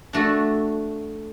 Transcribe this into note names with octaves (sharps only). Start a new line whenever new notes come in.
A3 D4 F#4 A4